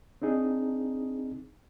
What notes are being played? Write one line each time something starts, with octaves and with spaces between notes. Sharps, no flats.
C4 D4 D#4 G#4